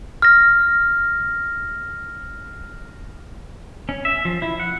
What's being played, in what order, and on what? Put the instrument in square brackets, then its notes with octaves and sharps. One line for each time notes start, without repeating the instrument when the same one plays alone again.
[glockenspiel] F6 A#6
[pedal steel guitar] C#4
E5
F3
E4
F#5